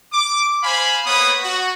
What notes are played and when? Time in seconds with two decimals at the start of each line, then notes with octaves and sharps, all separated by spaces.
0.13 D6
0.63 C5 F5 G#5 B5
1.06 A#3 B3 B4 C#5 B5 D#6
1.43 F#4